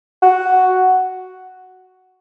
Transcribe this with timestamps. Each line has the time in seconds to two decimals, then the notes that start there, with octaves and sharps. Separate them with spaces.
0.22 F#4